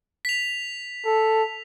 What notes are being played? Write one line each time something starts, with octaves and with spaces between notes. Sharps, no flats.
B6 F7
A4